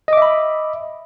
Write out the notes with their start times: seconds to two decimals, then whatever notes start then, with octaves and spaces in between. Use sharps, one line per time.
0.08 D#5
0.13 D6
0.17 E5
0.22 B5